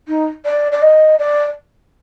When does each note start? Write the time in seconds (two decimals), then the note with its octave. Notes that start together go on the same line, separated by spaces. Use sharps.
0.08 D#4
0.45 D5
0.72 D5
0.82 D#5
1.19 D5